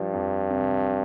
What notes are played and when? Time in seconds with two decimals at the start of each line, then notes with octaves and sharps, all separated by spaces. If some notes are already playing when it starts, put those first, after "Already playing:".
Already playing: G2 F3
0.14 F2
0.51 C3